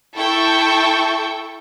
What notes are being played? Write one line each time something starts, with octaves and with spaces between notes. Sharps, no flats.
E4 A4 G5 C#6